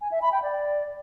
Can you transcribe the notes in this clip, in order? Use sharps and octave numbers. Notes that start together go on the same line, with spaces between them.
G#5
E5
B5
G5
D5